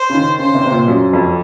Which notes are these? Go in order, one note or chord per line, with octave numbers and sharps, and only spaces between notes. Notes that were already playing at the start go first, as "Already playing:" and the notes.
Already playing: C5
C#3
D#3
C#3 C5
C3
C3
A#2
F#2
F2